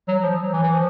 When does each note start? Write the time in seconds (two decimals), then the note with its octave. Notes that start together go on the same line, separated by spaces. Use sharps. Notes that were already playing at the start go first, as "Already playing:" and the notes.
0.08 F#3
0.23 F3
0.43 F#3
0.53 E3
0.63 E3
0.72 F3